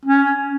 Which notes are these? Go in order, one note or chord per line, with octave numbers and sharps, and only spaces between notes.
C#4